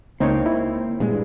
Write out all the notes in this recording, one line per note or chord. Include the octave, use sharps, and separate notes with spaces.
C#2 A#3 C4 D#4 C#5
E4
G2 A#2 G#3